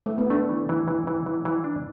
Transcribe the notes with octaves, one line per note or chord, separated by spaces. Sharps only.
A3
B3
A3 D4
E3
E3
E3
E3
E3
E3
D4